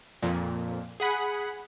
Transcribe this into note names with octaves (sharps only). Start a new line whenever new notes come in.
F2 A#2
G#4 F#5 B5